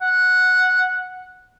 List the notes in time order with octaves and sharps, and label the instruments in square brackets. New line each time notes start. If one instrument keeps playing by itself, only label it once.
[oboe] F#5